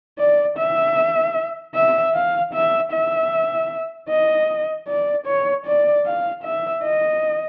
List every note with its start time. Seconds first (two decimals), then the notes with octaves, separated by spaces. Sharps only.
0.19 D5
0.58 E5
1.75 E5
2.14 F5
2.53 E5
2.92 E5
4.09 D#5
4.88 D5
5.27 C#5
5.66 D5
6.06 F5
6.44 E5
6.83 D#5